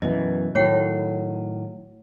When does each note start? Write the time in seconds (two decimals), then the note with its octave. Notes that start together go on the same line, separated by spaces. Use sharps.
0.02 F#2 B2 E3 D#5
0.55 A2 D#3 F#3 C#5 F#5 G5